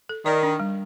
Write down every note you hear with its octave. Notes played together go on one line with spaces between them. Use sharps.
A4
D#3 D5
D4
G3